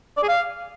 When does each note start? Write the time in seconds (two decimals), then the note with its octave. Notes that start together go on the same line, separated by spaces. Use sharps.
0.17 D5
0.23 G#4
0.29 F5